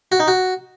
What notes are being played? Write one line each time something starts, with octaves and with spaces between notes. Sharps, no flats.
F#4
D#4
F#4